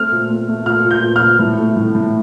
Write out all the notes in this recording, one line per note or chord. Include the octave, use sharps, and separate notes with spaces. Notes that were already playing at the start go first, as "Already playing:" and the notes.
Already playing: A3 C4 F6
A#2
A3
A3
A#2 F6
A#2
G6
A#2
A#2 F6
A2
A3
A2
A2